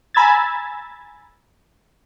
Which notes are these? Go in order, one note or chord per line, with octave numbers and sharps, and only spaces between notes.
G#5 A#5 B5 E6 G#6 A6